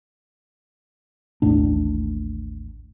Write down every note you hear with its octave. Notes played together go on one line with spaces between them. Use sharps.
A1 D#2 A2 D4